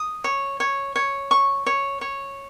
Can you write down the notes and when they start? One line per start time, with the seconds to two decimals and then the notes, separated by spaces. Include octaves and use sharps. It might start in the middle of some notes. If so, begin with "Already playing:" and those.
Already playing: D#6
0.24 C#5
0.60 C#5
0.96 C#5
1.31 C#6
1.66 C#5
2.01 C#5